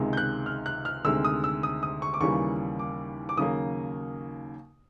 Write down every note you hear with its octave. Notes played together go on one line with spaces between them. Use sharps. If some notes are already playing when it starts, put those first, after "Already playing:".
Already playing: C#2 C3 D#3 G#3
G6
F#6
F6
F#6
F6
D2 C3 D#3 G#3 E6
D#6
E6
D#6
D#6
C#6
D6
D#2 C#3 E3 G3 A#3 C#6
D6
D6
D#2 C#3 F#3 A#3 D#6